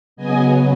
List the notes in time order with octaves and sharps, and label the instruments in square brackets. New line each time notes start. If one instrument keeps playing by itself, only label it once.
[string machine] C#3 F#3 B3 D#5 G#5